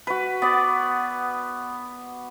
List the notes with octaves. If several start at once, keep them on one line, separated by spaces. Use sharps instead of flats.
F#4 B4
B3 D5